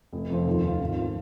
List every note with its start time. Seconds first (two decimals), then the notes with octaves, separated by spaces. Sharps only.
0.13 F1
0.30 F2 F3 C4
0.47 D#2
0.63 D#3 C4 F4
0.81 G#1
0.99 F3